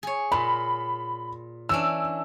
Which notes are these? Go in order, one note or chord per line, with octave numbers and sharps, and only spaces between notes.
G#4 C#5
A#2 B5
E3 C#4 D4 E6